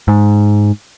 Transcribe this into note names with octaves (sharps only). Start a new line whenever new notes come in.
G#2